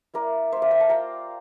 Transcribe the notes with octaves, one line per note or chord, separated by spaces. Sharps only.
A#3 E4 A#4 D5
A#3 E4 C5 E5
D5 F5
E5 G5
F5 A5
A#3 F4 G5 A#5